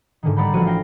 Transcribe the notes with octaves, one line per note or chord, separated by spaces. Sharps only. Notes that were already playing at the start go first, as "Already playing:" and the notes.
G#2 D3 D#3
G3 D5 F#5 A#5 B5 G6
A1 F3 F#4 D#7
F5 G5 A#6